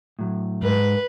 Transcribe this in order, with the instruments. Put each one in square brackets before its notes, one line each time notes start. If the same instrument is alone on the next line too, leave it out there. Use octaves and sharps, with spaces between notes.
[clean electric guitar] A2 F#3
[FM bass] G#2 [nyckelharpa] B4